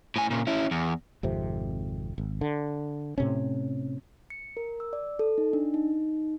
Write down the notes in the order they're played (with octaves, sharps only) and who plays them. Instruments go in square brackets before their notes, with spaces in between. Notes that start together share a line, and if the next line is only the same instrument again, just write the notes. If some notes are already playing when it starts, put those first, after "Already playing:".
[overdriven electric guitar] A2 G#5
A#2 C#3
C#4 E4
E2
[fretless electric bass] G#1 F2 C3
G#1
D3
A2 C3 C#4
[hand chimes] C#7
A#4
E6
D5
A4
D#4
D4
D#4